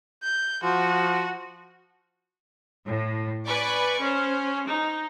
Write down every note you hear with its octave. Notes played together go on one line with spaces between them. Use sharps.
G6
F3 F#4
A2
B4 D5 G#5 B5 C#6 D6
C#4 C5
D#4